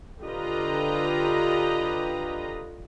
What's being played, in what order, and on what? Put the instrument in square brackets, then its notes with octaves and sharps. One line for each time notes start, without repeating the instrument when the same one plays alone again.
[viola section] D3 F4 G4 B4 D#5 A#5